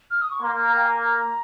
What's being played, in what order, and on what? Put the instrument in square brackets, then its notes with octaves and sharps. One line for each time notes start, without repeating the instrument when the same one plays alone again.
[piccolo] F6
D#6
C#6
[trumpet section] A#3 [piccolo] C6
[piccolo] A#5
G5
G#5
A#5